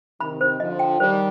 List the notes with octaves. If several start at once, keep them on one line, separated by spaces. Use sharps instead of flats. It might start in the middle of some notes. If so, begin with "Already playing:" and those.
C3 D#3 B5
C5
D3 F3 D#5
G5
D#3 G3 C5